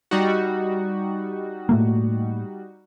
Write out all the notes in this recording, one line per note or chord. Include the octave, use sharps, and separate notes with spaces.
G3 D#4 F#4
A2 A3 A#3